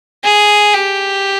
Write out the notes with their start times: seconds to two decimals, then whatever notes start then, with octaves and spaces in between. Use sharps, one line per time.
0.24 G#4
0.74 G4